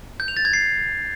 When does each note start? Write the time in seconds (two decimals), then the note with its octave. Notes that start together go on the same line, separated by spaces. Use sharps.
0.20 G6
0.28 F7
0.37 A6
0.45 G#6
0.53 C7